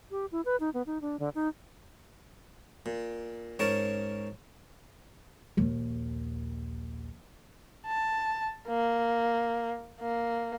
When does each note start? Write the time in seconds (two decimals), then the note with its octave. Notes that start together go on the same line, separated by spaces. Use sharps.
0.11 G4
0.32 E4
0.45 B4
0.60 D#4
0.74 B3
0.87 D#4
1.01 D4
1.20 D3
1.35 D#4
2.86 A#2
3.59 G#2 C#4 A#4 A5 C#6
5.57 A#1 D#2
7.87 A5
8.68 A#3
10.01 A#3